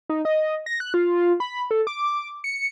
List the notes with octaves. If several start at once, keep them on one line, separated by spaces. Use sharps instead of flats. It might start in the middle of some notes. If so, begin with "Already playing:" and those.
D#4
D#5
A#6
F#6
F4
B5
A4
D6
C#7